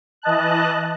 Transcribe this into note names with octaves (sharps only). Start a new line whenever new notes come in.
E3 D#5 A5 F#6